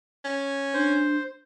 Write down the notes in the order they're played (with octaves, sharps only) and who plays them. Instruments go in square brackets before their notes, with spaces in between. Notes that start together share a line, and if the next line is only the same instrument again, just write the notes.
[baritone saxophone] C#4
[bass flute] D4 [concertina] C5